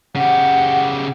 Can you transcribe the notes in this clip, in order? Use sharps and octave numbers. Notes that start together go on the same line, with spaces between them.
C#3 G4 F#5